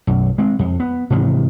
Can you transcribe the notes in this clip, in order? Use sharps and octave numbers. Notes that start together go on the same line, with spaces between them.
B1 F#2
G#3 C4
F2
B3
G#2 C3 D#3 E3